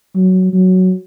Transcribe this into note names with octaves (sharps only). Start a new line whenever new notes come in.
F#3
F#3